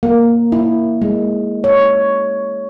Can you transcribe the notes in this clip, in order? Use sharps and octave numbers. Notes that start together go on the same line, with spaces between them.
A#3
E4
G#3
C#5